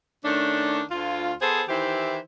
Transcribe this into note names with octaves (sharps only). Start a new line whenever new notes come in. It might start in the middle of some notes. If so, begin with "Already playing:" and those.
D#3 A3 C#4 D4
D2 F4
B3 G#4 A4 C5
D#3 E3 E4 G4 C5